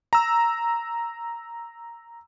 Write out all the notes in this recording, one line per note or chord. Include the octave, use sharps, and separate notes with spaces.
A#5 E6